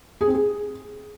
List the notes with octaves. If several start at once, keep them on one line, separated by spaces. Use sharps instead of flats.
G#4
C4
G#4